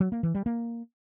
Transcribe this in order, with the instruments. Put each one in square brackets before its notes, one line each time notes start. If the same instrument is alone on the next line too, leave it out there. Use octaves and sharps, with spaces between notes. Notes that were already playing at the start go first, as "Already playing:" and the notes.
[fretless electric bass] F#3
A#3
E3
G3
A#3